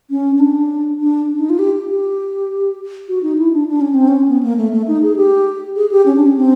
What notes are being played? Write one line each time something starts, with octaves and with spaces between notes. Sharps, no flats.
C#4
C#4
D4
D4
D4
D#4
F4
G4
G4
F#4
D#4
E4
D4
D4
C#4
C4
C#4
B3
A#3
A3
A3
D#4
G#4
G4
G#4
G4
C#4
D4
C#4
C4